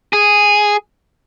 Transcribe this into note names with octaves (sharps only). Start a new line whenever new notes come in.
G#4